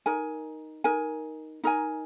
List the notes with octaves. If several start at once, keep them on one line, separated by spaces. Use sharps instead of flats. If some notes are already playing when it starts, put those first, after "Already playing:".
D#4 A#4 G#5
D#4 A#4 G#5
D#4 A#4 G#5